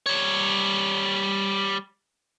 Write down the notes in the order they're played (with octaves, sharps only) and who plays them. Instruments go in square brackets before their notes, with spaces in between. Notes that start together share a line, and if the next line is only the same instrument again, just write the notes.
[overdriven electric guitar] G3 C#5